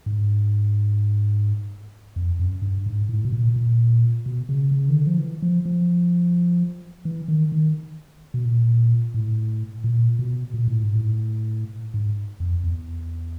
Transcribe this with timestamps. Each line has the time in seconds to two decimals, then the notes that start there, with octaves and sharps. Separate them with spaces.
0.06 G#2
2.16 F2
2.39 F#2
2.62 G2
2.86 G#2
3.09 A2
3.25 B2
3.32 A#2
3.56 A#2
4.26 B2
4.49 C#3
4.71 C#3
4.89 D#3
4.95 D3
5.07 F3
5.18 E3
5.42 F3
5.65 F3
7.05 E3
7.28 D#3
7.52 D#3
8.34 B2
8.45 A#2
9.14 A2
9.84 A#2
10.19 B2
10.54 A#2
10.68 A2
10.82 G#2
10.96 A2
11.94 G#2
12.40 F2
12.64 E2